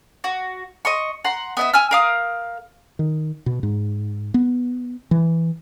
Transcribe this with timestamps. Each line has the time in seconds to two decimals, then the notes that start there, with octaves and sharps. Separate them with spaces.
0.24 F#4
0.85 D#5 C6 C#6
1.24 F#5 A#5 C6
1.57 B3 D#5 E5
1.73 G#5 E6 F6
1.91 A#4 F5 D#6
2.99 D#3
3.46 B2
3.63 G#2
4.34 B3
5.11 E3